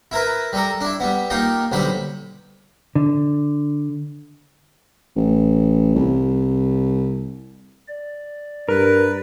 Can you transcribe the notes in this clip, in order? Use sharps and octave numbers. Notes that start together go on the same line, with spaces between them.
E4 A#4 B4
G3 A4 A#4
D4 E4
G3 B3
A#3 D#4 F4 G4
B1 D3 G3 C5 B5
D3
A1
C2
D5
G2 A#4 B4